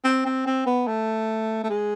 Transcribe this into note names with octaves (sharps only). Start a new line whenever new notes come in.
C4
C4
C4
B3
A3
A3
G#3